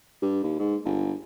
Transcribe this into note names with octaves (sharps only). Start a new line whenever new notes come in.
G2
D#2
G#2
G1